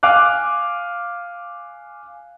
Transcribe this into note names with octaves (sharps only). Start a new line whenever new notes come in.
F5 G#5 D6 F6 F#6